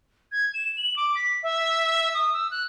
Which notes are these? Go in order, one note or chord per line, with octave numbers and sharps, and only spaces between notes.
G#6
E7
F#7
D6
B6
E5
D#6
E6
F#6